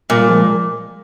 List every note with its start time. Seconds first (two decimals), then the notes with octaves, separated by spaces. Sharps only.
0.10 A#2 G3 A#3
0.29 F3 G#3